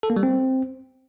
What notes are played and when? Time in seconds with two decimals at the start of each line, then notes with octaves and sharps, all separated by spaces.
0.03 A4
0.10 A#3
0.16 G3
0.23 C4